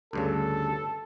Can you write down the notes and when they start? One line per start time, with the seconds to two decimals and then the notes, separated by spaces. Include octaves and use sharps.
0.13 D2 G2 C#3 A4